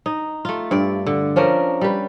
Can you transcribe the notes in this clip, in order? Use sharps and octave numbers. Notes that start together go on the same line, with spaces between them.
D#4
A3 F4
G2 D5
D3
F3 C#4 D4 A#4
G3 B4